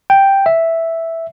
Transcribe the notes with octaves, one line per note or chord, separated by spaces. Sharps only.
G5
E5